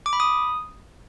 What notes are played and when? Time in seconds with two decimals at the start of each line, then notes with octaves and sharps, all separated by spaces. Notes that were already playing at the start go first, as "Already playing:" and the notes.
0.06 D6
0.13 B5
0.20 D#6